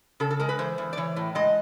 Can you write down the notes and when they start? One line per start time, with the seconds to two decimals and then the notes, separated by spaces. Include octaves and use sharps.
0.20 C#3 A4
0.30 A4
0.39 G#3 A#4
0.49 B4
0.59 E3 C5
0.78 E2
0.93 D5
0.97 E3 C#5
1.16 A2
1.35 G#3 D#5